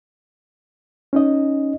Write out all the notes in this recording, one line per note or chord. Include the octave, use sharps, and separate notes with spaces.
C#4 D#4 D#5